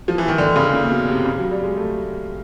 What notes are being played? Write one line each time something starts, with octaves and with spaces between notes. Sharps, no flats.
F3
E3
D#3
D3
C#3
A#2
B2
C3
C#3
F#3
G3
G#3
A3